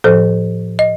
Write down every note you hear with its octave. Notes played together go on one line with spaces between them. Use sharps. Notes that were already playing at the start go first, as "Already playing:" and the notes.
A2 F3 A4 C5
D#5